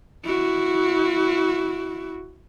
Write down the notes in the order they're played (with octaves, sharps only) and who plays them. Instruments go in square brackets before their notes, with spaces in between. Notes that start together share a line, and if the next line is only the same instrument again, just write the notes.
[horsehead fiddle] E4 F#4